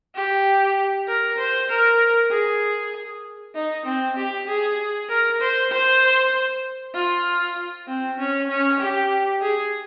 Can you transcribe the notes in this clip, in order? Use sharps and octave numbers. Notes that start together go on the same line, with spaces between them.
G4
A#4
C5
A#4
G#4
D#4
C4
G4
G#4
A#4
C5
C5
F4
C4
C#4
C#4
G4
G#4